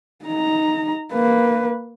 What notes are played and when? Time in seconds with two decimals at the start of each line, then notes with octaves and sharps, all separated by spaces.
0.25 D#4 A#5
1.13 A#3 B4